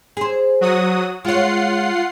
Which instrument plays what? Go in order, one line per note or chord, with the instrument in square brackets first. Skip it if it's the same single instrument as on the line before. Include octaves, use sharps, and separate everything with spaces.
[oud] G#4 C5
[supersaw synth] F#3 F#4 D#6
[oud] G#3 C#5 [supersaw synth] F4 F#5 C7